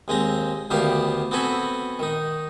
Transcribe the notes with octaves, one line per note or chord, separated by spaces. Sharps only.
D#2 G#3 C4 A#5
D2 D#3 B3 D4 G4 F5
B3 C4 F#4 A4 G#5 B5
D#3 D#4